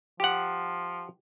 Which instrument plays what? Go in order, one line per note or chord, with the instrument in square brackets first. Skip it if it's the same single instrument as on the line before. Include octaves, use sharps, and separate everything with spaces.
[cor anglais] F3 [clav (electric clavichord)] G4 F#5